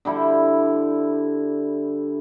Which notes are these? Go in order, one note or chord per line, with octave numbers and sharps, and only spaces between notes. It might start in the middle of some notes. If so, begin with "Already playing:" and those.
D3 G3 E4